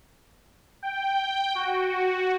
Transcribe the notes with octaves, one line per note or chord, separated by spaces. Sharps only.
G5
F#4